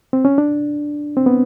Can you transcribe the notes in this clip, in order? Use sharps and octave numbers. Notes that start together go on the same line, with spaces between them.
C4
C#4
D4
C4
B3